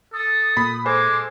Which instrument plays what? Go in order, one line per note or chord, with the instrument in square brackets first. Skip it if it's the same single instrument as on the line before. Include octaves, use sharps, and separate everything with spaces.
[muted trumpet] A4 [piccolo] D#6
[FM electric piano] A#2 [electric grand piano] B5
[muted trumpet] G#3 [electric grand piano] A4 C5 G#5 [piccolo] D6